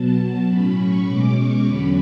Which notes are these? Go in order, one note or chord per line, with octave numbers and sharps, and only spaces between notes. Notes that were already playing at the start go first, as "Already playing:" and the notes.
Already playing: B2 F#3 B3 A5
A5
A2 F#3 C#4 B5
C#6
B2 G#3 C#4 D6
C#6
E2 D3 F#3 C#4 B5